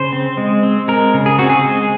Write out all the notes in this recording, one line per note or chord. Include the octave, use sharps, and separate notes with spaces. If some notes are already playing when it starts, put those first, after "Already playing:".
Already playing: C#3 C5
C4
G#3
C4
G#3 A#4
C#3
G#4
C4 F#4
G#4
G#3